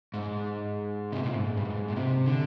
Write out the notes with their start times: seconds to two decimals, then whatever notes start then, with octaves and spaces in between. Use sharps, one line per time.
0.14 G#2
1.12 C3
1.23 A#2
1.34 G#2
1.57 G2
1.65 G#2
1.88 A#2
1.96 C3
2.26 D3